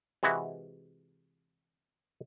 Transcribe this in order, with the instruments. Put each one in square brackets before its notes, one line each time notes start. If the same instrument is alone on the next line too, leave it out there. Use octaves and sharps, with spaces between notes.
[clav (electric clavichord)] C3 E3 G#3 E4 F#4